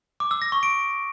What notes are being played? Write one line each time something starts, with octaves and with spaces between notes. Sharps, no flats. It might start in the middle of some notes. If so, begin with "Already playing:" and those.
D6
E6
A#6
C#6
D7